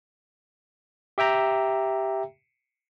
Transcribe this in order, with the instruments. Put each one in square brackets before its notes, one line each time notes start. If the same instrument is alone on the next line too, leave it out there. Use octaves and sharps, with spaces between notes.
[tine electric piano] G4 E5 G5 A#5